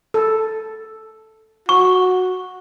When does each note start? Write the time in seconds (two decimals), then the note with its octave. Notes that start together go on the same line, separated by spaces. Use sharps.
0.14 A4
1.69 F#4 C#6